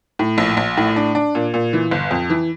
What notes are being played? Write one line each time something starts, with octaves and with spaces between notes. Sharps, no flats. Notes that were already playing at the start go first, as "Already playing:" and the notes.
A2
A#1
A#1
A2
D4
D4
A#2
A#2
E3
G1
F2
E3